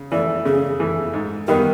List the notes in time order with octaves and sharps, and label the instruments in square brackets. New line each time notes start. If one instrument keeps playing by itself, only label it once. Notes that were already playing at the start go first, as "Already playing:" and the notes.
Already playing: [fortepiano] C#3
[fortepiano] E3 A3 [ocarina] D5
[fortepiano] C#3 [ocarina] G#4
[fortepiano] E3 A3
G#2
[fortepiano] D#3 G3 B3 D#4 [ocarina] A#4